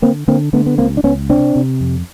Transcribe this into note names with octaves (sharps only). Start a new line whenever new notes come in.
D3 A#3 C4
D3 A#3 C4
D3 A3 B3
B3
C#2 A#3 C4
D4
C#2 B3 C#4
C3 C4 D4
C3
F2